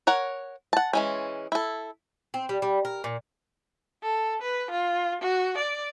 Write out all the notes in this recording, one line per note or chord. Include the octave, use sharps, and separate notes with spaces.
A#4 C#5 F#5
F#5 A5
E3 G#3 C#4
E4 A4
C4
G3
G3
A#4
A#2
A4
B4
F4
F#4
D5